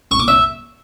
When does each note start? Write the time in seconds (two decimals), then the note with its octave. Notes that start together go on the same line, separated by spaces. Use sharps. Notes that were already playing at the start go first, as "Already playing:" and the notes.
0.11 C#6
0.20 D6
0.28 E5